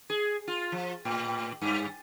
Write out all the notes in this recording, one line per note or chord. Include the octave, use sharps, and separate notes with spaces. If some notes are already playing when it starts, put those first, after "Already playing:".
G#4
F4
F3
A2
G2